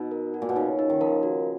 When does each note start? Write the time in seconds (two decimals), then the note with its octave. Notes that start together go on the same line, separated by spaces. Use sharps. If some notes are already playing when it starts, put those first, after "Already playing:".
Already playing: B2 D#4
0.11 A#4
0.34 F#4
0.42 A#2
0.49 B2
0.55 C#3 D#4
0.79 D#4
0.90 D#3
1.01 F3 A#4
1.23 F#4